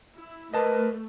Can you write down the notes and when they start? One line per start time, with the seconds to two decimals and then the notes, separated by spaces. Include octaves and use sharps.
0.15 E4
0.53 A3 A#4 B4 D#5 A5